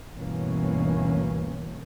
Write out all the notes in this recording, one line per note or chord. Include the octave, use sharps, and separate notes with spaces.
G1 D2 B2 E3 A#3 C#4